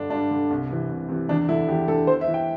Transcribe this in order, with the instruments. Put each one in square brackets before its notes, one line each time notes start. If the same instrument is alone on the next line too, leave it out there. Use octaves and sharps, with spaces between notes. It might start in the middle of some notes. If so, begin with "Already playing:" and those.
Already playing: [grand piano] G2 D3 D4
G2 D4
D3
C2
C3 E3
C2
C3 E3
E2 D4
D3 E4
E2 G4
D3 A4
E2 C5
E5
E3
G5